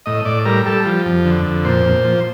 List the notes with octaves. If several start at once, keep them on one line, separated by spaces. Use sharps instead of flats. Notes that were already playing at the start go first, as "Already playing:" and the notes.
A2 D#5
A2 D5
G3 A#4
G3 A4
F3
F2
D3
F2
A#2 C5
A#2
F3